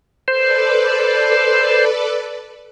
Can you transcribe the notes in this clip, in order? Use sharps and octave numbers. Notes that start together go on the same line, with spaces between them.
A4 B4 C5 D5